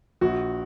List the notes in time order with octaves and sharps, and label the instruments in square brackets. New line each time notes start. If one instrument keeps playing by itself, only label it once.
[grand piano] A#1 F#4